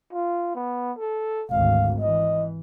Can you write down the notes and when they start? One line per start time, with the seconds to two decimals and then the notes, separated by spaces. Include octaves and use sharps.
0.13 F4
0.55 B3
0.98 A4
1.51 G#1 D2 F5
2.00 E3 D#5